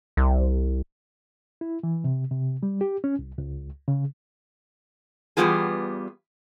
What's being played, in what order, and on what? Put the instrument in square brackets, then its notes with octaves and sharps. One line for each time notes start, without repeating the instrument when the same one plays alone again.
[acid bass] C2
[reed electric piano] E4
E3
C3
C3
G3
G4
C#4
C2
C#2
C#3
[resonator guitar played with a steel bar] E2 C#3 G3 B3 F4 G#4